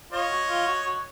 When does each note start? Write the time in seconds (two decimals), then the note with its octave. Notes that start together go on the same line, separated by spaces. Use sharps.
0.12 F4 C#5 D#5
0.31 F#4
0.49 F4
0.67 F#4
0.85 F#4